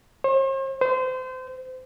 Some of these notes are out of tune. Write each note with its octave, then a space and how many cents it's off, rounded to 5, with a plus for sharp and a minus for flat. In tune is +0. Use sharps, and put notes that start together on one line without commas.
C5 +45
C5 -30